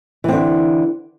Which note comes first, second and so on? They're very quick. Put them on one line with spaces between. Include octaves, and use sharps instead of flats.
E3 C4 D3